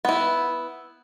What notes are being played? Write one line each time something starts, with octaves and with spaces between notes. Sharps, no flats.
B3 E4